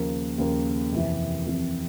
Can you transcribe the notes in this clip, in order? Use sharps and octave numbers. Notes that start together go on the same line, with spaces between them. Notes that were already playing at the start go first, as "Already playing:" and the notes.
Already playing: D#2 C#3 F3 A#3
D#2 C#3 F3 A#3
F2 C3 E3
F2 C3 E3